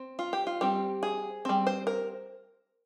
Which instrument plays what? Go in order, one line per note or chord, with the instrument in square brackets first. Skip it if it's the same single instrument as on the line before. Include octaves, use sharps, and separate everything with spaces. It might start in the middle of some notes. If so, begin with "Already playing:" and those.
Already playing: [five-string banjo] C4
F4
G4
F4
G3 C4 G4
G#4
G3 C4
C5
A#4